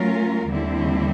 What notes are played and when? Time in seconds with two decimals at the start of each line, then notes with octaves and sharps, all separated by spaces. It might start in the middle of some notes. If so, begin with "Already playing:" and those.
Already playing: F#3 A3 C#4 F4 A#4
0.48 D#2 D3 G3 C4 E4